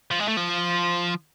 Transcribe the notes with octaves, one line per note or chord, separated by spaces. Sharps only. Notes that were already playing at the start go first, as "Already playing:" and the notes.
F3
G#3
A3
F3